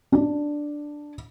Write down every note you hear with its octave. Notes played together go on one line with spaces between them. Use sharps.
D4